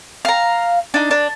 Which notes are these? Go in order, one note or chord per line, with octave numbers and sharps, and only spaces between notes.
F5 A#5
D4 D#4
D4